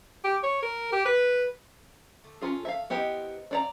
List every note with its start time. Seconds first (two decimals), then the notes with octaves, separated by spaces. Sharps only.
0.24 G4
0.43 C#5
0.63 A#4
0.92 G4
1.06 B4
2.24 D3 A3
2.41 C#4 F4 G#4
2.65 E5 F5
2.90 B3 D#4 E4 G4 C5 D#5
3.51 D4 D5 A#5